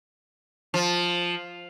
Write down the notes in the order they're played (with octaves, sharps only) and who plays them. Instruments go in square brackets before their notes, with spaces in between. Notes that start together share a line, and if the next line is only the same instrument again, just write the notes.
[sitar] F3